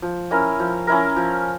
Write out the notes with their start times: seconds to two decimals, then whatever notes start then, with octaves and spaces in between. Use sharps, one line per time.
0.02 F3
0.31 C#4 E4 A#4
0.60 F3
0.87 C#4 E4 A#4
1.16 F3